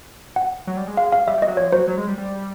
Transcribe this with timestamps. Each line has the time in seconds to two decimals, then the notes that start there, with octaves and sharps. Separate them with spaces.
0.36 F#5
0.67 F#3
0.77 G3
0.87 G#3
0.97 F5
1.12 F5
1.27 G3 E5
1.38 G3
1.42 D#5
1.48 F#3
1.57 F3 C#5
1.72 F#3 C5
1.87 F#3
1.97 G#3
2.08 G3
2.18 G3